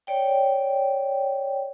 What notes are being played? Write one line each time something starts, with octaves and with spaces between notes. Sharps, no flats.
C#5 D5 G5